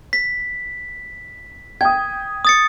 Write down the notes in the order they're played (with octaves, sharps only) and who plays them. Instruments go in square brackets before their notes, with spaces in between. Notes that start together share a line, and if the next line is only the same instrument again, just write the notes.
[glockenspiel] B6
[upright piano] G5 D#6 [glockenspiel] G#6
[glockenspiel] D#6 A6 C#7